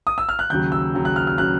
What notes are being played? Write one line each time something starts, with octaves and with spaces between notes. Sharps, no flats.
D#6
E6
F6
F#6
D#2 C#3 F#3 G6
E6
D#2 C#3 F#3
F#6
F6
F6
C#3 F#3 F#6